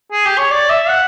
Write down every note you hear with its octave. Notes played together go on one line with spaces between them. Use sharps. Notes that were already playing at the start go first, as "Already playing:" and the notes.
G#4
G4
C#5
D5
E5
F#5